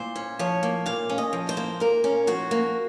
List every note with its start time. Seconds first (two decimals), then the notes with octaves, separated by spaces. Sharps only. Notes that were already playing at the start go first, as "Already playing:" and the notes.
Already playing: A#2 C5
0.16 C#4
0.39 F3 C#5
0.63 A#3
0.86 A#2 F5
1.10 C#4
1.18 D#5
1.33 F3
1.49 C5
1.57 A#3
1.80 A#2 A#4
2.04 C#4
2.27 F3 F#4
2.51 A#3